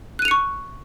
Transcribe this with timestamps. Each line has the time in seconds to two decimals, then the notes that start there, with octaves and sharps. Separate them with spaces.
0.19 F#6
0.22 D#7
0.25 F7
0.28 C#7
0.31 C#6